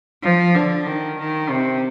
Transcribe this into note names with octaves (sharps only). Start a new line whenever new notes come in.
F3
D3
D#3
D#3
C3